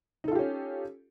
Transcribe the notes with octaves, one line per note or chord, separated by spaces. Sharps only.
C#4 D#4 F4 G4 A4